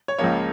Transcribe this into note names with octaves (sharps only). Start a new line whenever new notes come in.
C#5
C#2 C#3 F3 A#3 C#5